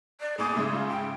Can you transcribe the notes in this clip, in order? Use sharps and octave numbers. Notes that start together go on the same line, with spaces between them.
D5
A1 D#2 G#4 D6
G#2 C#3 E5
F4
G5